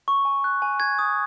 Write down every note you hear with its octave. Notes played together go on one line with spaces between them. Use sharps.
C#6
G#5
F#6
G#5
G#6
D#6